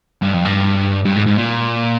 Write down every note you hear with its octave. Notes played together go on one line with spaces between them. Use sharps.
G2
F2
G2
G2
G#2
G#2
A#2